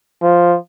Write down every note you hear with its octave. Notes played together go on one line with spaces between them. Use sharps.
F3